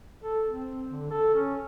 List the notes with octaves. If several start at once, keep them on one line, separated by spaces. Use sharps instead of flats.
A4
C4
D3
A4
C#4